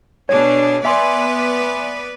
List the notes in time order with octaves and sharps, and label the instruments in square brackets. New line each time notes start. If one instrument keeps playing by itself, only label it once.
[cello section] B2 D4 G#4 [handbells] C#5
[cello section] B3 B4 D5 [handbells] E5 G#5 C6